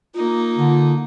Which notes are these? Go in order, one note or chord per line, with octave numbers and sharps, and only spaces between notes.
A#3 D#4 F4
D3